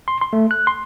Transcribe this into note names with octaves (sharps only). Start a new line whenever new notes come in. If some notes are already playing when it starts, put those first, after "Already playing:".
C6
C6
A3
F#6
C6